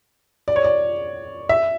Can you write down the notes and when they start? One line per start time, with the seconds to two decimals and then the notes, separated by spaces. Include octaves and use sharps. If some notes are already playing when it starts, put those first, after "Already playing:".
0.48 D5
0.56 C#5
0.64 D5
1.49 E5